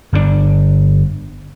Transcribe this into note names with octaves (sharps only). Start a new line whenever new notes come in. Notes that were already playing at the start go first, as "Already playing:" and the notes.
G1 G2 C3 D4